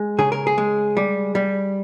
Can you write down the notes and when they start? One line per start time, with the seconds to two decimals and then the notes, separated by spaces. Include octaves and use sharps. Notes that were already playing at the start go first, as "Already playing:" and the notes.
Already playing: G#3
0.18 C#3 G#4
0.32 A#4
0.47 G#4
0.58 G#3
0.97 G3
1.35 G3